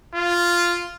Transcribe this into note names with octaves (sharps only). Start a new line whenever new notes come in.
F4